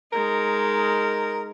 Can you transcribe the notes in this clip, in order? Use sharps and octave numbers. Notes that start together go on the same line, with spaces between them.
G#3 D#4 A#4